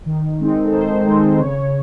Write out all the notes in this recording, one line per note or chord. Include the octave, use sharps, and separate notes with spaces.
D#3
G#3 C4 D#4
A4
D#3 C5
G#3 C4 D#4
C#3 C#5